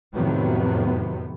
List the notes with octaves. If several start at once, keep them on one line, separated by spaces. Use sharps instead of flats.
F2 A2 C3 D#3 F#3 B3